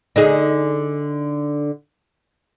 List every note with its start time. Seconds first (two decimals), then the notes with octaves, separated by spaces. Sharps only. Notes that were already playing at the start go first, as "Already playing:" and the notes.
0.16 D3 D#4 G#4